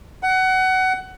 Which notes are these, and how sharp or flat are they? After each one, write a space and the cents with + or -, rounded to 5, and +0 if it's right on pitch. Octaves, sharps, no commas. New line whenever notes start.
F#5 +20